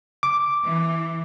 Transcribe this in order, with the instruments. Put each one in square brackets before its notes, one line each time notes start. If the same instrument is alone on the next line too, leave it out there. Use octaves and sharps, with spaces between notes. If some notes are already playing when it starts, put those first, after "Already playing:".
[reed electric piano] D6
[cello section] E3